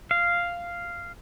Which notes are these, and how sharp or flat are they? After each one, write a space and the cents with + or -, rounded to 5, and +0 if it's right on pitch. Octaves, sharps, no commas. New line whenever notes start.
F5 -5